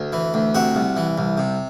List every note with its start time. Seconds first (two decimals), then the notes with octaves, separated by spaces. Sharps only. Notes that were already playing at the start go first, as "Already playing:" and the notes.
Already playing: D2
0.13 E3
0.34 D2
0.55 C3 F#4
0.75 C2
0.97 E3
1.18 C2
1.38 C3